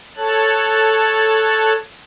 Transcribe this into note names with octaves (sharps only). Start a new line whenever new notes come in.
A4 C#5 A5 F#6